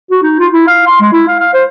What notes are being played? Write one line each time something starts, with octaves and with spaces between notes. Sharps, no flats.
F#4
D#4
F4
E4
F5
C6
G#3
E4
F5
F5
C5